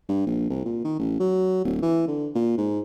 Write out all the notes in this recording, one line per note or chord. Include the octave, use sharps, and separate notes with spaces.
G2
A#1
C2
A#2
D#3
A1
F#3
D1
E3
D3
A#2
G#2